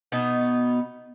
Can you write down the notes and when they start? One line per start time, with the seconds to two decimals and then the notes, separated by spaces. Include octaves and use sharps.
0.12 B2 B3 D#4